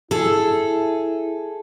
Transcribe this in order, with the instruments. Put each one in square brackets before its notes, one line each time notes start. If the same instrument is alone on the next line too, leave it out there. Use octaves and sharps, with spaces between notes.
[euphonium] E4 [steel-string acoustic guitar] G#4 A4